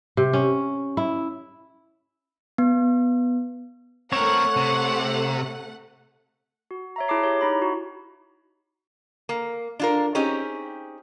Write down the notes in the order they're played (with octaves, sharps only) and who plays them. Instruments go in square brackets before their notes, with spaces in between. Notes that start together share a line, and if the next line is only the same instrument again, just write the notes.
[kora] C3
C#4
E4
[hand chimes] B3
[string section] A3 F#5 [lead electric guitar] C4 A#4 [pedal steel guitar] C#5
[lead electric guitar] C3
[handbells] F#4
C#5 E5 A#5
E4 G#4 A5 D6 C7
G4 C#5
D#4 E4 A#5 B5
F#4
[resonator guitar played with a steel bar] A#3
D4 F4 A#4
C4 C#4 D#4 G4 G#4